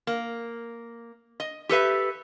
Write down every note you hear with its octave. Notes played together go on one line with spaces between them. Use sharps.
A#3
D#5
G4 A4 B4 E5